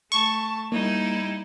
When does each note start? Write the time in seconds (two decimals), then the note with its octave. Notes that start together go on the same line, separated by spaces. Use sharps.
0.12 A3 A5 C#6
0.72 G3 A#3 D#4 E4